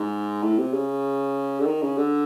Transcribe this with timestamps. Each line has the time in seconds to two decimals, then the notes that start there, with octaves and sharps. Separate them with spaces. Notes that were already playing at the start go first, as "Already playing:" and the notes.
Already playing: G#2
0.43 A2
0.58 C3
0.74 C#3
1.60 D3
1.66 D#3
1.82 C#3
1.98 D3